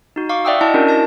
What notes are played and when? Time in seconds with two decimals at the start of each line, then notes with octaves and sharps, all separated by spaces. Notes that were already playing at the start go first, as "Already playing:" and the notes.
0.16 D#4 F#4
0.29 F5 C#6 D6
0.45 D5 E5 F#5 G5 D#6 E6
0.61 E4 D#5 A5
0.74 C#4 D4 E4 F#4 A#4
0.87 A#4 A5 A#6